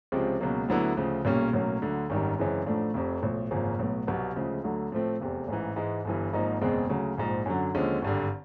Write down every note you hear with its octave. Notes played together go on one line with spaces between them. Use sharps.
C#2 C3 F3 G#3 C4
C#2 B2 F#3 A#3
D2 D3 F#3 B3 E4
D2 C#3 F3
B1 A#2 G3 A#3 C#4
B1 A2 F#3 A#3 C#4
D2 D3 F#3
G#1 F#2 D#3 G3
F#2 C#3 E3 G#3 C4
A1 A2 F3 A3 D4
F1 F2 C3
B1 A2 F3
G#1 F#2 C#3 F3 A#3
B1 A2 F#3 B3
C2 B2 F#3 B3
D2 C#3 F3 G#3
D2 D3 F#3 A3
A2 F3 A3 C4
F1 E2 C3
A1 G#2 E3
G#2 E3 G#3
G1 G2 E3
G#1 G#2 F3 A#3 D#4
F#1 E2 B2 G#3 C4
D2 C#3 F#3
A#1 G#2 F3
F#2 D3 F#3
D#2 D3 F3 G#3 C#4
G#1 G2 D3